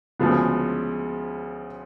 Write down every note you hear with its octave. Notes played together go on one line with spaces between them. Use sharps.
D2 C#3 F3 G#3 B3